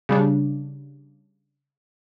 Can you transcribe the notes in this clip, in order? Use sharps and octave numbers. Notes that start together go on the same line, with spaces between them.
C#3 G3 D4